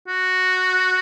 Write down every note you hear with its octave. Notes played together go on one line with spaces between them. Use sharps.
F#4